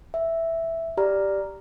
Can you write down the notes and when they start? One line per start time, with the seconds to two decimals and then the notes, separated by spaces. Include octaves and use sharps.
0.14 E5
0.97 G4 D5 A#5 F6